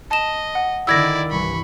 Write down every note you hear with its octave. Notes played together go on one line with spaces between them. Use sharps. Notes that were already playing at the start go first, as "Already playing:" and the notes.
D#5 A5 E7
F#5
D3 D#3 E4 D5 E6 G#6 A#6
C2 G2 E3 B5 C#6